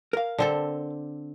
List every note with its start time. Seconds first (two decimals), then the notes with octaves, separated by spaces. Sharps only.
0.13 A#4 F5
0.38 D3 C4 A4